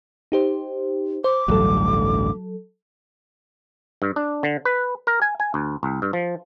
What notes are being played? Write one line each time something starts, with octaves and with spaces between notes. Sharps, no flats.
D#4 G4 C5
C5 D6
A1 D2 G2 F#3 A4
G2
D4
D3
B4
A#4
G#5
G#5
D2
C2
G2
F3